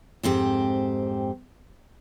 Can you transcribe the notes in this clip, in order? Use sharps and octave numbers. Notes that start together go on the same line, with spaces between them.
F2 G#2 C4 G4